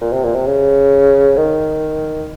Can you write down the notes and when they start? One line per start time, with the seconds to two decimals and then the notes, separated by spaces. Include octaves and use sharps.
0.01 A#2
0.12 C3
0.24 A#2
0.35 C3
0.47 C#3
1.37 D#3